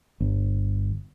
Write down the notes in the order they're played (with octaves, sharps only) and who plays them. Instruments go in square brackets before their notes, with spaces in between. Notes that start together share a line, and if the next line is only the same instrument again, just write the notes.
[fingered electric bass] G1